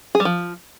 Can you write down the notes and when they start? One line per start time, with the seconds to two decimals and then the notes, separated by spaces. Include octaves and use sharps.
0.15 G#4
0.20 G3
0.25 F3